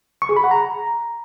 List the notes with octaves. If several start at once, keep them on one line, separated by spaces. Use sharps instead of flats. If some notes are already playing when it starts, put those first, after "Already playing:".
C#6
G#4
B5
F#5
A#5